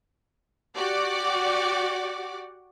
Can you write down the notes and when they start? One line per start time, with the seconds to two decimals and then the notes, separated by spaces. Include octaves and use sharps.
0.75 F#4 G4 D5 F#5 D6